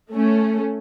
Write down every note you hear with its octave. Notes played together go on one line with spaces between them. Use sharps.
A3 C#4